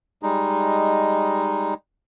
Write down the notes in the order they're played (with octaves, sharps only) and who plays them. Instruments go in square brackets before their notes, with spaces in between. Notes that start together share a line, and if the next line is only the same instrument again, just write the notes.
[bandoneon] G3 G#3 D#4